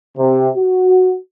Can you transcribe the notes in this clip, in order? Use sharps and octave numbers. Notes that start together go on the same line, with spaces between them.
C3
F#4